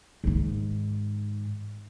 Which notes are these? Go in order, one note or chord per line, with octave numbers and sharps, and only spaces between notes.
G#2 D#3